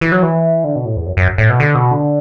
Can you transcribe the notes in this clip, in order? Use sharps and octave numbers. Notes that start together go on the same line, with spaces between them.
E3
F#3
E3
D3
B2
A2
E2
F#2
F#2
A2
B2
D3
B2
D3